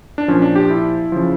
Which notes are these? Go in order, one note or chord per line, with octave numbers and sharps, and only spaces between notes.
D4
A#2 F3 C#4
D4
G4
E4
C#3 F3